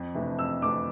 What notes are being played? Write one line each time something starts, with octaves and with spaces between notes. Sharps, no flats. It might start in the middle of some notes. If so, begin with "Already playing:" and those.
Already playing: F2
C3 E3 A3 D4
F2 E6
C3 E3 A3 D4 D6